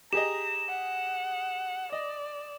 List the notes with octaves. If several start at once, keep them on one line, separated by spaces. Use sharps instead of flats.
G4 G#4 D#5 A#5 E7
F#5
D5 D#5